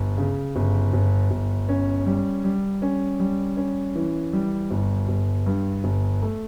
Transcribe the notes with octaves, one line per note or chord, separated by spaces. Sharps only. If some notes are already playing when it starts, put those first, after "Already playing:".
Already playing: G1
C#3
G1
G1
G1
C#4
G3
G3
C#4
G3
C#4
E3
G3
G1
G1
G2
G1
A3